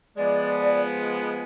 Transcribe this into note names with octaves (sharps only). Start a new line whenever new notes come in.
F3 G#3 B3 D5